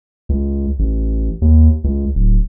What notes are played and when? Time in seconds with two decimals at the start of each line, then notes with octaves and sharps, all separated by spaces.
0.29 C#2
0.79 A1
1.42 D#2
1.84 C#2
2.15 D1